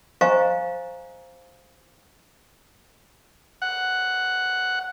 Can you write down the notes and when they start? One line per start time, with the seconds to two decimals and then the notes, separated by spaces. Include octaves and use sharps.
0.21 C5 D#5 F5 G#5 A#5 C#6
3.62 F#5